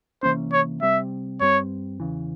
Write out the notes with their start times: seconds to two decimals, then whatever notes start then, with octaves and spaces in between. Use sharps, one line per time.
0.23 C3 E3 A#3 C#4 C5
0.53 C#5
0.82 C3 G3 C4 E5
1.41 G2 G3 C4 C#5
2.00 E2 C#3 E3